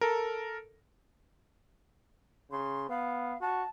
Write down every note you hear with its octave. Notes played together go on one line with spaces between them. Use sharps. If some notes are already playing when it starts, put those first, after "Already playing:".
A4 A#4
C#3 C6
B3 F5
F#4 A5